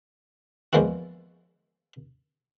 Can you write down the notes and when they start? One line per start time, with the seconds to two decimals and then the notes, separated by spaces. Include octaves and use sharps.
0.73 E2 F3 G#3 A#3 E4 F#4